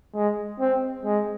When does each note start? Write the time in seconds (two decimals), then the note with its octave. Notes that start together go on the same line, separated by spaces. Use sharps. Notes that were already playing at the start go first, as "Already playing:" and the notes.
0.15 G#3
0.60 C4
1.05 G#3